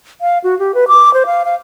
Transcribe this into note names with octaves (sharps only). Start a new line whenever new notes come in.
F5
F#4
G4
B4
D6
C5
F5
F5